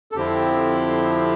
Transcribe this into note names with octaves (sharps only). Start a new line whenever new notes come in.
A4
F2 D3 F3 C4 E4 G4